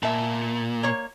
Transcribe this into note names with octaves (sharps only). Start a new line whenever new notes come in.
A#2 E5 A5
A#3 C#5